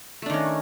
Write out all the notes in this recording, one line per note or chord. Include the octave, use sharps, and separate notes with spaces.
D#3 A3 C#4 D4